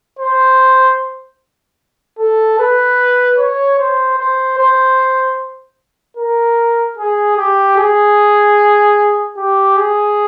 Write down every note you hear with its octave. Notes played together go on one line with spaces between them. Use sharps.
C5
A4
B4
C#5
C5
C5
C5
A#4
G#4
G4
G#4
G4
G#4